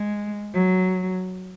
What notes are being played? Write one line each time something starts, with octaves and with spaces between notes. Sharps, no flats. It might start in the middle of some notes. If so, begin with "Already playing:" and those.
Already playing: G#3
F#3